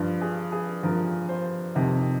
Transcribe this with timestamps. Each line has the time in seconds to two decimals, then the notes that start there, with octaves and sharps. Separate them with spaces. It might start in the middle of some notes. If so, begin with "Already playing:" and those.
Already playing: G2 F3
0.21 G#4
0.52 G#4
0.83 G2 F3 A#4
1.29 C5
1.75 F2 C3 D#3